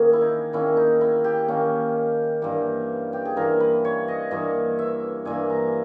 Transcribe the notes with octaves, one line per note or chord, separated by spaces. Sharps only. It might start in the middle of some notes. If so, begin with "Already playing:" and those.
Already playing: D#3 A#3 C#4 G#4
E4
D#4
D#3 A#3 C#4 E4
D#4
E4
G4
D#3 A#3 C#4
G2 E3 A#3
G4
G#4
G2 E3 A#3 A#4
B4
C#5
D#5
G2 E3 A#3 D#5
E5
G2 E3 A#3 G#5
A#5